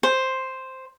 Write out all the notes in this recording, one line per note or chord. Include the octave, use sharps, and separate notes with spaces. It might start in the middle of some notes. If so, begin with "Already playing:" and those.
C5